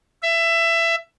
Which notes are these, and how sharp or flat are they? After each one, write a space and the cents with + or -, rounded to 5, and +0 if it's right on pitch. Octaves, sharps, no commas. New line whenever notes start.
E5 +20